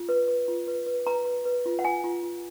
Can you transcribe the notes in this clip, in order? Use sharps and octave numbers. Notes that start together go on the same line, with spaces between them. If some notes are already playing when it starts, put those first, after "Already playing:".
Already playing: F4
B4
B4
F4
B4
B4
B4 A#5
B4
B4
F4
F#5
F4 G#5
F4
F4